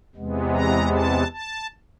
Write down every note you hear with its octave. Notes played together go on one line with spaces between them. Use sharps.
E2 C3 E3 G#3 B3
A#5
A5
A5